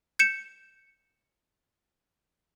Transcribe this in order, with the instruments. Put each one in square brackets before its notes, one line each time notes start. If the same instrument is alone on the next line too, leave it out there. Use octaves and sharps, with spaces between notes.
[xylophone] G6 C#7 E7